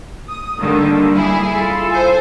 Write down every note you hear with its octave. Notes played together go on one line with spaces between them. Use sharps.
D#6
D3 D#3 G3 A#3
E4 G#4
F4 A4
C5 G#5